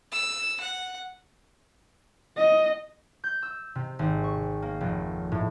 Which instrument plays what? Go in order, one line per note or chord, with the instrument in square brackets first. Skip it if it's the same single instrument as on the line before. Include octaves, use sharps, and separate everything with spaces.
[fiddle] E6
F#5
[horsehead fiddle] D#5
[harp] G6
E6
C3
G#1
C#6
A#3
F1
A2